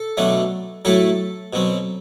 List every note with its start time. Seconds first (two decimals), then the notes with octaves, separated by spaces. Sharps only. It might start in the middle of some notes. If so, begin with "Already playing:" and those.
Already playing: A4
0.17 B2 F#3 A3 D4
0.85 A2 F#3 A3 E4 A4
1.53 B2 F#3 C4